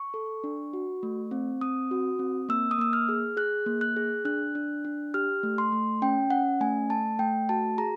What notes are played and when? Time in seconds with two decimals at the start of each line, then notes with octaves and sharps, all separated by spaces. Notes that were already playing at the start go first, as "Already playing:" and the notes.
Already playing: C#6
0.14 A4
0.44 D4
0.73 F#4
1.03 A3
1.31 C4
1.61 C4 D#6
1.91 F#4
2.19 C4
2.49 A#3 E6
2.71 D#6
2.78 A#3 E6
2.93 F6
3.09 G#4
3.37 G#4 F#6
3.66 A#3
3.81 F#6
3.96 G#4
4.25 D4 F#6
4.55 D4
4.85 D4
5.14 G4 F6
5.43 A3
5.58 C6
5.72 A3
6.02 C#4 G5
6.30 C#4 F#5
6.60 A3 G#5
6.90 A3 A5
7.19 A3 G5
7.49 F#4 A5
7.78 G#4 A#5